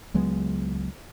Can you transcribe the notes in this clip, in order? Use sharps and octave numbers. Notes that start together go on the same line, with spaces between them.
C#2 F#3 G#3 B3